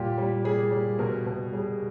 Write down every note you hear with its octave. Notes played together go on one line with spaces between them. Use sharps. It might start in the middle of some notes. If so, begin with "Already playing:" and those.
Already playing: A#2 G3 G4
G3
G3 G#4
G3
B2 A#4
B2
G3 G#4